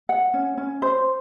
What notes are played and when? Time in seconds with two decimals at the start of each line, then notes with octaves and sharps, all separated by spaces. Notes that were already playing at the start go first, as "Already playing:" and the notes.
0.09 F#5
0.34 C#4
0.57 C#4
0.82 C5